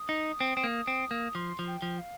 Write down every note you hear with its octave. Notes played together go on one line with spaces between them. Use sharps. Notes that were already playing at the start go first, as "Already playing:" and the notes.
Already playing: D#6
D#4
C4
C4
A#3
C4
A#3
F3 C6
F3
G5
F3
F5